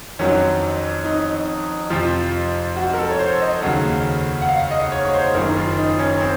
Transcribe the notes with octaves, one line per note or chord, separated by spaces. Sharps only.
F2 D#3 F#3 C#4
D#4
F2 C3 F3 F4
F#4
A#4
A4
C#5
C5
D#5
D#2 C#3 F#3 F#5
F#5
F5
D#5
C#5
C#5
C5
F#1 F#2 D#3 A#4
F4
D#4
C#4
C4